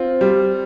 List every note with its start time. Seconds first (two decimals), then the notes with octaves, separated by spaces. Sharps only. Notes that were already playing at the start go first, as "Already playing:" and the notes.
Already playing: C4 F4
0.21 G3